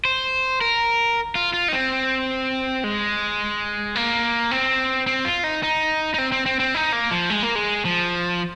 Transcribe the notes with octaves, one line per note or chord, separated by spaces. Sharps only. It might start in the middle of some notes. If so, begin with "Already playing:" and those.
C5
A#4
F4
F4
D#4
C4
G#3
A#3
C4
C4
F4
D#4
D#4
D#4
C4
C4
C4
C4
D#4
A#3
F3
G#3
A#3
G#3
F3